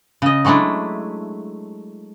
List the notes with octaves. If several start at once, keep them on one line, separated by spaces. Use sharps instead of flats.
C#3 D#5
F#3 G#3 A3 D4 E4